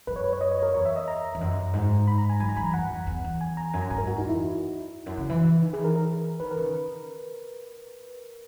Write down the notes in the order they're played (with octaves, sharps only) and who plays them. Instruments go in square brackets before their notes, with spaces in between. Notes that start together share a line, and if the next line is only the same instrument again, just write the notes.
[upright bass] F#2 [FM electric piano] B4
[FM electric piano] C#5
B4
C#5
D#5
C#5
A#4
[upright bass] E2 [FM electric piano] C#5
[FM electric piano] E5
D#5
A#5
[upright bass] E2
F#2
G#2
[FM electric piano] B5
A#5
G#5
[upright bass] F#3 [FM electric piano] G#5
[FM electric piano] A#5
[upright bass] E3 [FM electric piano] B5
[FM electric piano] A#5
[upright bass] F#2 [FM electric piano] F#5
[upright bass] E2
E2
E2
[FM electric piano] G#5
A#5
[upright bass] F#2 [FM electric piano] G#5
[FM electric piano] A#5
[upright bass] G#2 [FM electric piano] G#5
[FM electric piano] A#4
[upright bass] F#2 [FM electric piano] F#4
[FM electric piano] D#4
[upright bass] E2
[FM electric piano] E4
[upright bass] F#2
C#3
E3
D#3
[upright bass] E3 [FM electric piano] G#4
[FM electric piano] A#4
A#4
[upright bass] D#3 [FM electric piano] B4
[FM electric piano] A#4
[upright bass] C#3